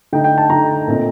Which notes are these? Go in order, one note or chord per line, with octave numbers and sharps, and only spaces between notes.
D3 A3 D#4 G5
G5
A5
D3 A3 D#4 A#5
A#2 A3 C4 D#4